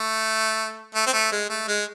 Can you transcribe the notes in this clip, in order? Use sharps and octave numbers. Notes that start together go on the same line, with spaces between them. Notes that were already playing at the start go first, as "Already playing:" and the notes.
Already playing: A3
A3
C4
A3
G#3
A3
G#3